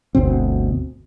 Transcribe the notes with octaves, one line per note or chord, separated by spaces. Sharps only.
G1 D2 B2 C4